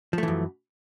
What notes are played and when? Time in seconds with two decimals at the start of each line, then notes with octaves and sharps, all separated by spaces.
0.13 F3
0.18 A3
0.23 E3
0.28 F#2